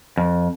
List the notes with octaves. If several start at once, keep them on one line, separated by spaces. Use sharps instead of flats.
F2